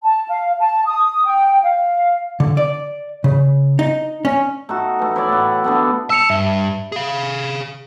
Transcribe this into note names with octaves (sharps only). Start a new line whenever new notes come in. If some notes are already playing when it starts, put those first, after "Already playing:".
A5
F5
A5
D#6
G5
F5
D3
D5
C#3
D#4
C#4
A3 D#4 F#4
E3 A3
E4 C#5 D5
A2 F#5
D3 A3 B3
A5 E6 C#7 F7
G2 E5
G#4 F5